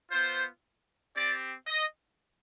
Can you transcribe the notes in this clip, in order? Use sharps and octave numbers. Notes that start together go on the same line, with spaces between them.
B3 F4 C5
C4 G4 D5
D#5